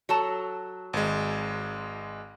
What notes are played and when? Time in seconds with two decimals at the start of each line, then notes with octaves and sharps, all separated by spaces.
0.09 F#3 A4 A5
0.93 G#1 G#3